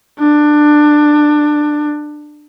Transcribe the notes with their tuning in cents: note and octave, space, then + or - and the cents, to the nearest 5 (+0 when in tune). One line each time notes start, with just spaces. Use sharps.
D4 +20